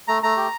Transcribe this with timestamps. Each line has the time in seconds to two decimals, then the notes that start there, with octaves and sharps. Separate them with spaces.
0.08 A3 A#5
0.23 A3 A#5
0.37 G4